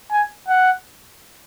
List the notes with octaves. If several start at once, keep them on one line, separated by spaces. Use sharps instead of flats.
G#5
F#5